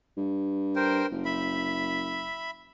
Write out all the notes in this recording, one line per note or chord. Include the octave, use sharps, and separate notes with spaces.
G2
A#4 C5 G5
F#1
E5 B5